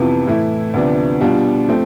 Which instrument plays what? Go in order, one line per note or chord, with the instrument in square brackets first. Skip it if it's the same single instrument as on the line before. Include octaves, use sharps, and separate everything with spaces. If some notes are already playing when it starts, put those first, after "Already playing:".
Already playing: [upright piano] F2 C3 E3 B3 F4
A2 E3 A3 E4
D2 C3 F3 B3 D4
B2 G3 D4 F4
F3 A3 C4